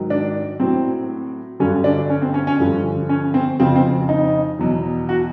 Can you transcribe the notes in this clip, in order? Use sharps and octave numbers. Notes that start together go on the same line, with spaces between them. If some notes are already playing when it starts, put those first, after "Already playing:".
Already playing: G#2 D#3 F#3
D4
A2 F#3 C4
G2 D3 F#3 C#4
D4
C#4
C4
C#4
C#4
G2 D3 F3
C#4
C4
F2 C#3 F3 C4
C4
D#4
E2 B2 F#3
F#4